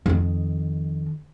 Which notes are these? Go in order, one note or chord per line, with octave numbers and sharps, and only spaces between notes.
F2 D#3